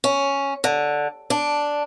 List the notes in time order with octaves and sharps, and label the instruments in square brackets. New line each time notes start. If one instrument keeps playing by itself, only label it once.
[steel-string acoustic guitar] C#4
D3
D4